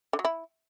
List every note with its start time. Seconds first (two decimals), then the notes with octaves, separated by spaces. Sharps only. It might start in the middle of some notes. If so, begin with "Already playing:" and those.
0.13 D3
0.19 F#3
0.25 E4